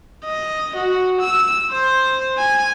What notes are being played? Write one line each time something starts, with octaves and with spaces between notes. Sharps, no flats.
D#5
F#4
E6
C5
G#5